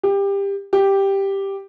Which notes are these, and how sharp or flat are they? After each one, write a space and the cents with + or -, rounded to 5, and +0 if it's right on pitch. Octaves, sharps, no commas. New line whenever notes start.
G4 +20
G4 +0